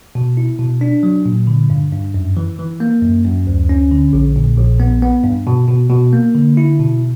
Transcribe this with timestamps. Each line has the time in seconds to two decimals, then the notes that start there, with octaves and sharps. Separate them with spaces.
0.15 B2
0.37 E4
0.59 B2
0.81 D4
1.03 F#3
1.26 A#2
1.47 D3
1.70 G2
1.93 G2
2.14 F#2
2.37 E3
2.59 E3
2.80 A#3
3.02 F#2
3.24 F#2
3.47 D2
3.69 C#4
3.92 D3
4.13 A#1
4.36 A#2
4.58 A#1
4.80 B3
5.02 B3
5.24 G2
5.47 B2
5.68 B2
5.90 B2
6.13 A#3
6.35 D3
6.57 E4
6.80 B2